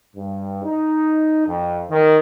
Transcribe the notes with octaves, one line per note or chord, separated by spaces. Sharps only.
G2
D#4
F2
D#3